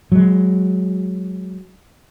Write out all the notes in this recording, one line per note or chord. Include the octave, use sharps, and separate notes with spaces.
F#3 G#3